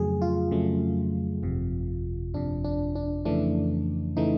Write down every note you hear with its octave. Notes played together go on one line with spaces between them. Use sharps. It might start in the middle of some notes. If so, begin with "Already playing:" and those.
Already playing: F2 C#3 F#3 A3 G#4
F4
F2 C#3 F#3 A3
G1 F2 C3
G1 F2 C3 D4
D4
D4
F2 C#3 E3 A3 D4
C#3 E3 A3 D#4